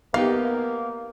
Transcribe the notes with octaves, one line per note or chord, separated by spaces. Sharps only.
A#3 B3 D#4 G4 F5